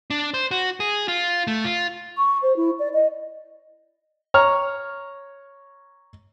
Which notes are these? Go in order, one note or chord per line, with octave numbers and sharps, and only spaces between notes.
D4
C5
F#4
G#4
F4
A3
F4
C#6
C5
E4
D5
D#5
C#5 A#5 F6